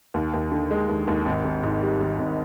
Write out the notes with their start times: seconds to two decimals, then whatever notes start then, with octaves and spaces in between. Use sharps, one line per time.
0.14 D#2
0.34 D#2
0.52 D3
0.71 G#3
0.89 D#2
1.07 D#2
1.26 G#1
1.45 G#1
1.63 G#2
1.82 G3
2.01 G#1
2.19 G#1